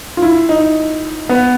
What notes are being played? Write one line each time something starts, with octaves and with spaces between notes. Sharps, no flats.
F4
E4
D#4
B3